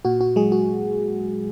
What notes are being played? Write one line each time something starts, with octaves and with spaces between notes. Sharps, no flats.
A#2 F#4
F#4
F#3 G#3 G#4
F#4